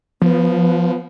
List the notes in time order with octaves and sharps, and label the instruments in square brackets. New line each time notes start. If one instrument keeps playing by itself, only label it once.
[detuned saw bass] F3 [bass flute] B3